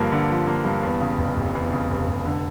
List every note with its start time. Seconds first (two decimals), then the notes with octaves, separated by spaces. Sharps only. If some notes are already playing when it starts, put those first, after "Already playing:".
Already playing: G2 D3 F3 A#3
0.12 D3
0.30 F3
0.47 A#3
0.65 G2
0.83 E2
1.01 C#3
1.18 F1
1.37 F1
1.55 E2
1.72 C#3
1.90 F1
2.08 F1
2.25 D3